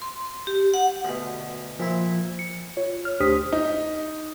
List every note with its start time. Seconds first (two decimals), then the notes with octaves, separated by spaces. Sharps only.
0.02 C6
0.47 G4
0.74 F#5
1.05 D2 B2
1.80 A#2 F3 E4
2.39 C#7
2.77 F4 C#5
3.05 F6
3.20 D2 D4 G4 C5 D#6 B6
3.52 D#4